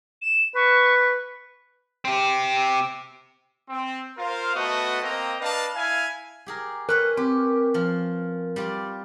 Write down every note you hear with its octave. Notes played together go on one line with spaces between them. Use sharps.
E7
B4 C#6
C4 G4
C4
F4 A#4 C5 F5
A3 B3 F#4 D#5 A5
A#3 C4 D#5 G5 A#5
D4 B4 D#5 F5 A5
E4 F5 G#5
G4 G#4 A#4
C#4 A#4 B4 C#5 F#6
C4 G4
F3 F4
G3 F4 D5